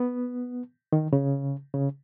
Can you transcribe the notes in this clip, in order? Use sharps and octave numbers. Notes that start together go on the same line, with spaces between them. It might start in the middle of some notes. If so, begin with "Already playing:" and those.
Already playing: B3
D#3
C#3
C#3